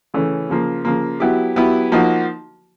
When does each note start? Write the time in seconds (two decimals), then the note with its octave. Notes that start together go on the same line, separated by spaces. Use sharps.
0.14 C#3 E3 A3 C#4
0.50 C#3 F3 A#3
0.85 C#3 F3 A#3
1.20 F#3 B3 E4 G4
1.56 F#3 B3 E4 G4
1.92 F3 A#3 D#4 F#4